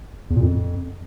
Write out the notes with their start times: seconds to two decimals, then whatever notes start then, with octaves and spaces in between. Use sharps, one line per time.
0.30 E2
0.36 A#2
0.42 F2